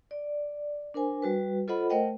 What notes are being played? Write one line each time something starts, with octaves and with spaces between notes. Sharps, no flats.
D5
D4 A#4 C5 G#5
G3 F#4 B4
F4 A4 C5 D#5 F#5 B5
A3 A#4 C5 D#5 F#5 G5